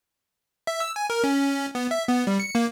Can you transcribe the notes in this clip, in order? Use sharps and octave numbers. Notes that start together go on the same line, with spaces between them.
E5
E6
G#5
A#4
C#4
B3
E5
B3
G3
C#7
A#3